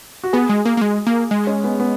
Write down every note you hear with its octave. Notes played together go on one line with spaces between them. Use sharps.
F#4
B3 G#4
G#3
A#3
A#3
G#3
A#3
G#3
C#4
B3
B3